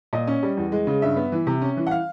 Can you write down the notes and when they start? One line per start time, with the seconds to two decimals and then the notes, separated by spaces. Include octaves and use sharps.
0.13 A#2 D#5
0.27 C#4
0.43 G3
0.57 E2
0.72 G#3
0.87 C#3
1.02 G2 E5
1.17 B3
1.32 E3
1.47 C3
1.62 C#4
1.77 E3
1.87 F#5
1.91 F5